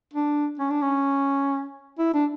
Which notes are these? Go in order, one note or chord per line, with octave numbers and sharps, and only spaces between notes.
D4
C#4
D4
C#4
E4
D4